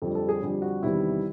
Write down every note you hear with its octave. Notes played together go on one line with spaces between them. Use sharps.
F2 D3 G3 A4
A4
G#4
F2 D3 G3 G4
F#4
E2 C3 D#3 G3 E4